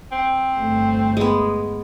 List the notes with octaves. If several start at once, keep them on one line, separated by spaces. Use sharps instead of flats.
C4
G1 A3
G#3 B3